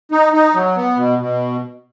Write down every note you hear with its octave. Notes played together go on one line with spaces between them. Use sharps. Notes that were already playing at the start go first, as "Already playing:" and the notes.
D#4
D#4
F#3
B3
B2
B2